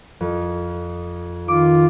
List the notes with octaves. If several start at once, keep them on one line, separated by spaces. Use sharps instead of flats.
F2
D#3 F4 D6